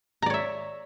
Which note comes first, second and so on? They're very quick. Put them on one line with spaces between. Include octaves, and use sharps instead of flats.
A#5 D5 C#5 E5